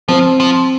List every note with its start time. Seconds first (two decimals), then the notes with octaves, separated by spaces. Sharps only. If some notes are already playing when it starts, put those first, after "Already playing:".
0.08 F3 C4
0.40 F3